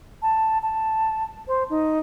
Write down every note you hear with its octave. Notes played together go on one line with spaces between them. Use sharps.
A5
A5
C5
D#4